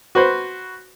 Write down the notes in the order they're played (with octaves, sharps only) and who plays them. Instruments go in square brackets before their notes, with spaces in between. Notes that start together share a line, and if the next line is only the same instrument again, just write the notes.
[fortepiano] F#4 B4 C5